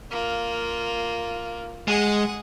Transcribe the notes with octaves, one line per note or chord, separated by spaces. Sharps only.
A#3 F4
G#3 G#4 F#5